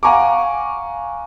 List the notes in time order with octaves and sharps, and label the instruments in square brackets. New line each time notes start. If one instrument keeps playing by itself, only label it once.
[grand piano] F5 F#5 G#5 A#5 C#6 D6